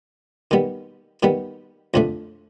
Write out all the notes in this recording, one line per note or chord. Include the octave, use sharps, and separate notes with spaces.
D#3 G3 B3
D#3 G3 B3
F2 D3 F3 A3